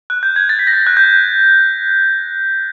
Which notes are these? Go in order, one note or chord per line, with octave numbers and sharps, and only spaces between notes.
F#6
G6
G#6
A6
B6
A#6
A6
F#6
G6